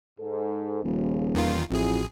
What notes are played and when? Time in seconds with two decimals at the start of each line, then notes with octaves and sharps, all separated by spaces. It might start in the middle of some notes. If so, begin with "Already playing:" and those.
0.20 G#2 A4
0.84 D#1 D#2 C#3 F3
1.35 E2 D#3 F4
1.70 A1 F2 E4 F#4 G#4